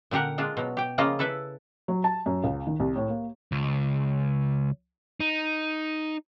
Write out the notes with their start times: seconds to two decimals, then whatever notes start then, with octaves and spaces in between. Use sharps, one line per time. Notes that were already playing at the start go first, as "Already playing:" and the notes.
0.11 A#2 D3 G4 A#4 F#5
0.38 G#3 D4 F4
0.57 B2 F#3
0.77 G4 G5
0.98 C#3 F3 A#3 F4 D#5
1.19 E4 A4 B4 E5
1.88 F#3
2.04 A5
2.26 F#2
2.44 C#2
2.67 D#3
2.80 C2
2.96 A2
3.09 A#3
3.52 C#2
5.20 D#4